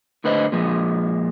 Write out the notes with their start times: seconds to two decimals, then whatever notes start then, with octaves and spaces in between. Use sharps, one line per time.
0.24 A2 D3 B4 C5 D#5
0.52 A#2 F3 G#3